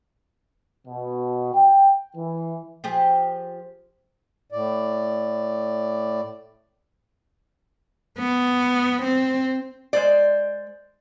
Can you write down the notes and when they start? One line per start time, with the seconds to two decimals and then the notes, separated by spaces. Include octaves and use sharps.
0.88 B2
1.54 G5
2.17 E3
2.84 F3 G4 G#4
4.52 A2 D5
8.19 B3
9.04 C4
9.93 G#3 C5 D5